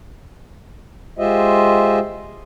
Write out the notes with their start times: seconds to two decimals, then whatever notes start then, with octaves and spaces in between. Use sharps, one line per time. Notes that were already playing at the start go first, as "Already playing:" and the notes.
1.19 G#3 F4 G4 C5 D#5 E5